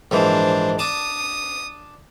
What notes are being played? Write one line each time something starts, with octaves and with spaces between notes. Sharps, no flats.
A#1 G#2 E3 D4 C5
D4 A5 D#6